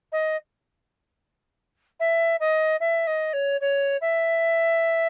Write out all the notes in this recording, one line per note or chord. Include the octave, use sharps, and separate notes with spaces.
D#5
E5
D#5
E5
D#5
C#5
C#5
E5